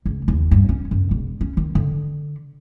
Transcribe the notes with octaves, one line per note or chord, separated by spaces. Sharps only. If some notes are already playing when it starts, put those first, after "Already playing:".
C#2
D#2
G2
C#4
F#2
E1
C#4
D#3
D3